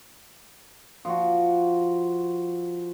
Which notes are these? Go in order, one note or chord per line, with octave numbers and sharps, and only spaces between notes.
F3 F#4